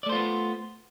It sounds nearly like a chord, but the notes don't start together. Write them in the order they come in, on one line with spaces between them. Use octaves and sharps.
D5 A3 C5 F4 B3